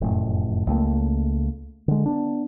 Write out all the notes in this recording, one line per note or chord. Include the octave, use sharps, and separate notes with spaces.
F1 F#2 A2
C#2 A3 A#3
D3 G#3
B3 D4